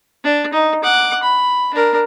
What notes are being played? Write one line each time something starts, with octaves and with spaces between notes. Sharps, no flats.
D4
D#4
F#5 D6
B5
D4 A#4